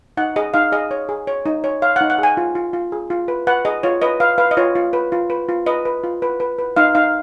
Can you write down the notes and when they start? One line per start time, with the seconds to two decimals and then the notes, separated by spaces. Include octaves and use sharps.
0.17 D#4 F#5
0.36 G#4 D#5
0.54 D#4 F5
0.72 G#4 D#5
0.91 C#5
1.09 G#4
1.27 C#5
1.46 D#4
1.64 C#5
1.82 C#5 F5
1.96 D#4 F#5
2.10 F#5
2.19 G#4 G#5
2.37 F4
2.55 F4
2.73 F4
2.92 G#4
3.10 F4
3.28 B4
3.47 B4 F#5
3.65 G#4 D#5
3.83 F4 C#5
4.02 B4 D#5
4.20 B4 F5
4.38 B4 F5
4.51 D#5
4.57 F4 C#5
4.75 F4
4.93 B4
5.12 F4
5.30 B4
5.49 F4
5.66 B4 D#5
5.85 B4
6.04 F4
6.22 B4
6.40 B4
6.59 B4
6.76 D#4 F5
6.95 D#4 F5